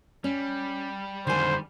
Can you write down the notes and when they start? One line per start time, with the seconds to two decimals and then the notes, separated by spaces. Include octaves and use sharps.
0.24 G3 C#4
1.27 F2 D3 D#3 C5 G#5